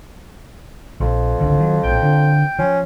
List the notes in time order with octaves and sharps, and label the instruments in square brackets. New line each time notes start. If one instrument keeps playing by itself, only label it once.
[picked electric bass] A#1 [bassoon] F2
[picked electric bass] G#1 C#2 D3
D#3 F#3
[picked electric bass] A#1 A2 [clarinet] G5
[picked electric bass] D3
[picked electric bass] F3 [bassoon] C#4